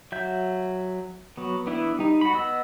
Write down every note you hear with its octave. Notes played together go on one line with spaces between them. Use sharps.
F#3 E5 G6
F#3 B3
E3 B3 D4 E4
G3 D#4
F#4 B5
B3 D#5 E6